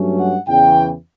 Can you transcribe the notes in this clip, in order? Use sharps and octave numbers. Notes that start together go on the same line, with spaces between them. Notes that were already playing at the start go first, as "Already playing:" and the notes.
Already playing: G2 F#3 A3 C#4
F#5
E2 C#3 E3 G5